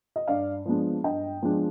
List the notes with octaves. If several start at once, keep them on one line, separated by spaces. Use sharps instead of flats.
D#5
G2 D5 F5
F3 G#3 B3 D4
G2 D#5 G5
F3 G#3 B3 D4